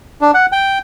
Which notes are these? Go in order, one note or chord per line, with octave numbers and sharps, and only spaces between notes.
D4
F#5
G5